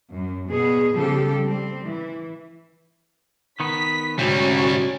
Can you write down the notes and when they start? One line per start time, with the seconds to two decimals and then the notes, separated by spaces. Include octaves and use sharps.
0.13 F#2
0.49 B2 B3 G#4
0.93 C#3 F3 G3 G4 A4
1.44 G3 C4
1.86 E3
3.60 D#3 B3 B6
4.19 D2 G#2 C3 G3 C#4 F#4